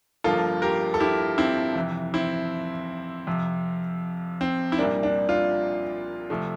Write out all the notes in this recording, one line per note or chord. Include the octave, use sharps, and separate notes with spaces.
G1 G2 F3 A#3 F4 A4
G4 A#4
A4
E4 G4
C4 E4
F2 C3 E3
C4 E4
F2 C3 F3
C4
E4
C2 A#2 G3 A#3 D4
D4
D4 F4
C3 F3 A3